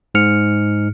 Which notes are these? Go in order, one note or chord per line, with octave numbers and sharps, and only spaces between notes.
G#2 F6 C#7